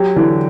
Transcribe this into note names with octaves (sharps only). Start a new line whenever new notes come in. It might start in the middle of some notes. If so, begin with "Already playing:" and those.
Already playing: F#3 G4
D3 E3